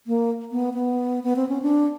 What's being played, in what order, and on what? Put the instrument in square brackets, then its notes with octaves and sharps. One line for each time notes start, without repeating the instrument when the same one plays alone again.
[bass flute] A#3
B3
B3
B3
C4
C#4
D4